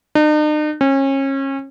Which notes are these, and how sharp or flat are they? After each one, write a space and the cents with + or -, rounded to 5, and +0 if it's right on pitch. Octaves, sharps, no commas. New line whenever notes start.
D#4 -45
C#4 -30